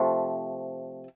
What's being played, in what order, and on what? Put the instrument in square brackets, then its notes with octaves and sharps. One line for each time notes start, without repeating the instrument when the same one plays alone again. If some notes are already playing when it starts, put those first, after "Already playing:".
Already playing: [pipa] C3 F3 A3